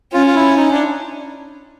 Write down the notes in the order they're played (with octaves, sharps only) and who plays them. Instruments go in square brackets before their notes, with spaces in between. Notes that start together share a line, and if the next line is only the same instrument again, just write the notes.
[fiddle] C#4 [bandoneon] F4
[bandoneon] F4
E4
D#4
D4